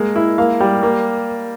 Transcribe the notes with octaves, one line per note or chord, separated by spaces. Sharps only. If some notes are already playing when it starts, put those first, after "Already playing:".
Already playing: G#3 A#3
E4
A#3 F5
G3
A#3